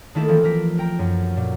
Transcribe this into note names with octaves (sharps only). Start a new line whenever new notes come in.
D#3 A3 A#3 D#4 E4 A4
E3 F3 A#3 C4
A#3 A#4 B6
A#4 G5 A#5
F#2
A#2